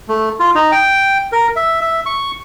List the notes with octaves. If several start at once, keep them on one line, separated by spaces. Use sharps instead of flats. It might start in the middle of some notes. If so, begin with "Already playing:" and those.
A3
F4
D#4
G5
A#4
E5
E5
C#6